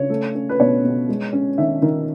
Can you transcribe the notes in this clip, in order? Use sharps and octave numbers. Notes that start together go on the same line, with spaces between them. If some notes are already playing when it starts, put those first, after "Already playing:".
Already playing: C#3 C#5
A3
C#4
B4
B2 C#5
B2
G#3
C#4
D#3 E5
D#3